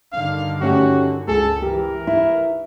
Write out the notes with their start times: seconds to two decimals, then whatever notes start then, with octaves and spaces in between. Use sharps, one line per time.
0.13 G2 D3 D#3 F5
0.61 A3 C#4 F#4 G4
1.28 C#2 G#4 A4
1.62 E3 G4 A#4
2.07 E4